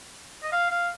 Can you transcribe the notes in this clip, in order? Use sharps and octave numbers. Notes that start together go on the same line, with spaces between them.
D#5
F5
F5